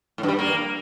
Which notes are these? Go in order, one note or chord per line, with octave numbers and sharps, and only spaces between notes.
A2
G2
G3
G2
A#3